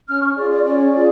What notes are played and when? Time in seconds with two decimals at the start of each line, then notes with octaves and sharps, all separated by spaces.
0.08 C#4 F6
0.22 C#6
0.36 F4 G#4 D5
0.51 D5
0.64 C#4 D5
0.93 F4 G#4